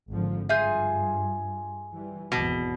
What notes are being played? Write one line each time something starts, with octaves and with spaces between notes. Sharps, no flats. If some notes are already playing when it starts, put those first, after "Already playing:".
G#1 D3 F3
G2 F4 G#4 E5 G#5 G6
E3 G3
G#1 E2 B2